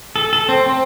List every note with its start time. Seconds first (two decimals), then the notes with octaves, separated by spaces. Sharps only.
0.16 A4
0.33 A4
0.49 C4
0.66 C4